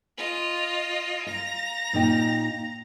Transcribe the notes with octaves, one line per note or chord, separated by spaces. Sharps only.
F4 D#5
F5 A#5 A#6
A#2 D#4 G5